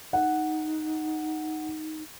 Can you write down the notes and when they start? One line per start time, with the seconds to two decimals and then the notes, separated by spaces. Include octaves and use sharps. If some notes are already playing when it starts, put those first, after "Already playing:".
0.13 D#4 F#5